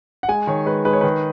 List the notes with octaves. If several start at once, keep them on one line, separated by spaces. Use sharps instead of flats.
F#5
G#3 G#5
D#3 C#5
G#3 B4
G#3 B4
C#5
D#3 B4